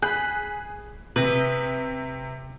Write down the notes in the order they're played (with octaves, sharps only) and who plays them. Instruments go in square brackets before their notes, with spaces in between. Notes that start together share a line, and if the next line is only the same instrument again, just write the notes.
[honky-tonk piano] G#4 F#6 [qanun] B5
[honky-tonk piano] C3 [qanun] B4 D#5